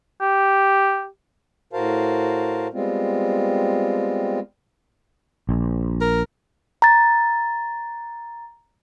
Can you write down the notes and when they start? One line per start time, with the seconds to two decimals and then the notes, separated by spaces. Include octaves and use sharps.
0.21 G4
1.73 A2 F#4 A#4 C5 F5 A5
2.73 G3 G#3 B3 C4 F4
5.49 A#1
6.01 A#4
6.82 A#5 A6